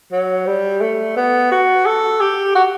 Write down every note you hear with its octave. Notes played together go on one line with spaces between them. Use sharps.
F#3
G3
A3
B3
F#4
A4
G4
F#4